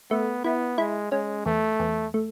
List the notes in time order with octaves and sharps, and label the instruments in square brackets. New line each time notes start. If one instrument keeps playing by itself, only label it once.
[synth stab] A3 [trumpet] B3
[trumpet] B3 [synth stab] E4
[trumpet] G#3 [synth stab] E4
[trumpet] G#3 [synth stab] C#4
[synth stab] E2 [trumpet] A3
[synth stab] E2
A3